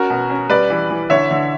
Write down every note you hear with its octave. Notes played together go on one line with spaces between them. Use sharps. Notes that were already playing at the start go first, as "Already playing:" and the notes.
Already playing: C#4 F#4 A#4
B2
C#4
G3 B4 D5
E3
E3
D3 C#5 E5
D3